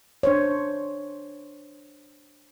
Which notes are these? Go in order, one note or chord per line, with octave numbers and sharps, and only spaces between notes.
D4 C5 C#5